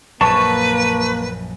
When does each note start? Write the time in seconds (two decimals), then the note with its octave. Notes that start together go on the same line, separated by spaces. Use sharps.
0.21 A#1 F#2 A#3 B4 A5 C#6